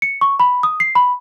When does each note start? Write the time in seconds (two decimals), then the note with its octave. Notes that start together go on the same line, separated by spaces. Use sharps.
0.02 C#7
0.21 C#6
0.40 B5
0.63 D#6
0.80 C7
0.95 B5